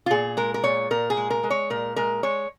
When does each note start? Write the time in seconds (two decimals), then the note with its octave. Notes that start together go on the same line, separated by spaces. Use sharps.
0.06 F4
0.10 A#2 G#4
0.37 G#3 A#4
0.54 A#4
0.64 A#2 C#5
0.91 A#2 A#4
1.10 G#4
1.17 G#3
1.30 A#4
1.43 G#3
1.50 C#5
1.70 A#2 A#4
1.96 G#3 A#4
2.23 G#3 C#5